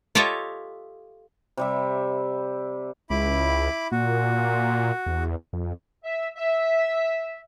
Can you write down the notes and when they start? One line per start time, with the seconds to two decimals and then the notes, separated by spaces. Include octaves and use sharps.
0.15 F4 G4 A4 C#5 D#5 E5
1.57 C3 G3 E5
3.10 C#2 E4 B5 D6
3.92 A#2 F#4
5.06 E2
5.53 F2
6.04 E5
6.36 E5